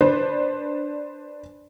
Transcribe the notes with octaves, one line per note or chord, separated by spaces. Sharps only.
D4 B4 C5 D5